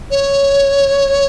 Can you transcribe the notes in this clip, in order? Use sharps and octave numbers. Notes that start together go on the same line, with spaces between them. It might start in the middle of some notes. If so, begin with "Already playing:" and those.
C#5